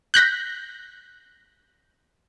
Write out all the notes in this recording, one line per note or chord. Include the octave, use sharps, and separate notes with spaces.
F#6 G6 A#6 B6